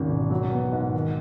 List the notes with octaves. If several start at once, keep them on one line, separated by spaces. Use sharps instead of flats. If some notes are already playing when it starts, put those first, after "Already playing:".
Already playing: G#1 D#2 C#3
E1
F#3
B3
G#2
D#3